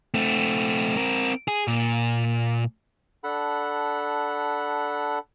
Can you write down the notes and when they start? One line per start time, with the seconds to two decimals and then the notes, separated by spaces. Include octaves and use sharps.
0.14 A3 C4
0.97 C4 A#4
1.48 G#4
1.68 A#2
3.24 D4 A4 F#5 B5